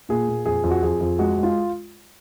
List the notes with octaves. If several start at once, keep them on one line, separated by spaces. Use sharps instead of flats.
A#2 G#4
A#2
F2 G#4
F2
F#4
F2 G#4
F2
G#3 F#4
G#3 F4